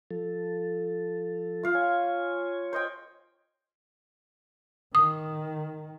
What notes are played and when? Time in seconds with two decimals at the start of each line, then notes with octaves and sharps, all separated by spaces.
0.11 F3 A4
1.63 F4 F5
1.75 C#5 G#5
2.73 C5 D#5 G5
4.95 D#3 D#6